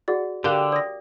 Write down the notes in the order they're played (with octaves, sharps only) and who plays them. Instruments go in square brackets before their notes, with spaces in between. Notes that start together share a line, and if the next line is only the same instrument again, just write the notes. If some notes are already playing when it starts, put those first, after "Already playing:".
[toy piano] F#4 G#4 F#5 [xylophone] D5
[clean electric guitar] D3 [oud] G4 [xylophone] A#4 F5 F#6
[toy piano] D5 [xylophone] D#6 A#6